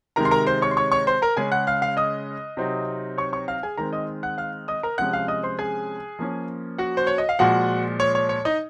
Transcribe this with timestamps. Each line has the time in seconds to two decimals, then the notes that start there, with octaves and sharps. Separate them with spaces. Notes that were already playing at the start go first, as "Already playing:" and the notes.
0.16 C3 D#3 G#3 A#4 A#5
0.25 C6
0.31 A#4 A#5
0.47 C5 C6
0.62 C#5 C#6
0.71 C6
0.77 C#5 C#6
0.92 C#5 C#6
1.07 C5 C6
1.22 A#4 A#5
1.37 C#3 G#3 C#4 G#4 G#5
1.52 F#5 F#6
1.67 F5 F6
1.82 F5 F6
1.97 D#5 D#6
2.57 C3 F#3 C4 D#4
3.18 C#5 C#6
3.33 C#5 C#6
3.48 F5 F6
3.63 G#4 G#5
3.78 D#3 G#3 C4 A#4 A#5
3.93 D#5 D#6
4.23 F#5 F#6
4.38 F5 F6
4.68 D#5 D#6
4.83 A#4 A#5
4.98 C3 F3 G#3 C#4 F#5 F#6
5.13 F5 F6
5.28 D#5 D#6
5.43 C5 C6
5.59 G#4 G#5
6.19 F3 A#3 C#4
6.78 F#4 F#5
6.97 C5
7.07 C#5
7.18 D#5
7.29 F5
7.39 A#2 F3 G#3 F#4 F#5
8.00 C#5
8.15 C#5
8.29 C#5
8.45 D#4 D#5